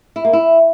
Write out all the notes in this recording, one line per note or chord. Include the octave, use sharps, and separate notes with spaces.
E4
A#3
E4